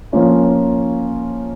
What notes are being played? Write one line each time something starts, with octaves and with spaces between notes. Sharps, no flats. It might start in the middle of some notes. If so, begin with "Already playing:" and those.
F3 A#3 C#4 F4